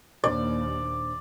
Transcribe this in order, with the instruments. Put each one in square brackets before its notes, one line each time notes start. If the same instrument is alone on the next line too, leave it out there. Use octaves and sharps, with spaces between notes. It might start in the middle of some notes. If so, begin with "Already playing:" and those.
[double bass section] D#2 [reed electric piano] A#2 D4 C5 [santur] D5